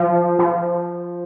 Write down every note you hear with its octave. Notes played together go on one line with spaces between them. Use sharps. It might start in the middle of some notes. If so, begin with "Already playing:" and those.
Already playing: F3
F3